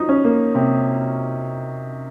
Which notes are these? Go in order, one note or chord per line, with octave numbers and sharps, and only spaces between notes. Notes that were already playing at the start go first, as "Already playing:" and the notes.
Already playing: F3 F#3 D#4
C#4
A#3
C3